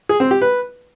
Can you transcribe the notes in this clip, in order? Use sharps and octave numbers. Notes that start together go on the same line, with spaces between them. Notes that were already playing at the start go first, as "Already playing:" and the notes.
G#4
C4
G4
B4